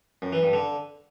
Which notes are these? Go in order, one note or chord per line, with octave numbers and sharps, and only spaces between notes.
F#2
E3
G2
D3